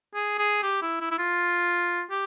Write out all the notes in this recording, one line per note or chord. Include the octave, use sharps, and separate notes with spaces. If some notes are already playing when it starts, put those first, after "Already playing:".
G#4
G#4
G4
E4
E4
E4
F4
G4